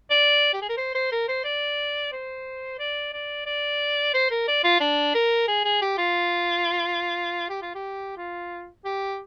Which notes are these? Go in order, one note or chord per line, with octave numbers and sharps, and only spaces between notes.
D5
G4
G#4
A#4
C5
C5
A#4
C5
D5
C5
D5
D5
D5
C5
A#4
D5
F4
D4
A#4
G#4
G#4
G4
F4
G4
F4
G4
F4
G4